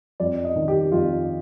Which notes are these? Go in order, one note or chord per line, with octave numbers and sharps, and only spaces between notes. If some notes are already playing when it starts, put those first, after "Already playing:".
F2 D5
D#5
D#3
G4
F2 F4